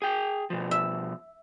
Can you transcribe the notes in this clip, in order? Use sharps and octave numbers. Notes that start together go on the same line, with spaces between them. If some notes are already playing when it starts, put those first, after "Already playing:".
G#4 G5
B2 F3
E5